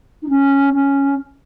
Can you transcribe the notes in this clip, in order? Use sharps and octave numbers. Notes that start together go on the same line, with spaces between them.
D#4
C#4
C#4